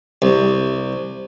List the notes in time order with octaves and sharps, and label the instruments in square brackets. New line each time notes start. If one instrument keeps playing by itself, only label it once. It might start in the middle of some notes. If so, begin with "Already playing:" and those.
[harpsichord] C2